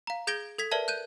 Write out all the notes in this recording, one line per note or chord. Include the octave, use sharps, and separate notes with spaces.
F5 A#5
G#4 G6 G#6 A#6 D7 G7
A4 G#6 B6
A#4 B4 D5 E5 A5
F#6 G6 D#7